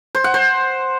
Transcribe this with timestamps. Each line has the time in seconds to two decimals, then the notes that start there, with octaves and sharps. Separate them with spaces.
0.15 C5
0.24 F#5
0.34 C5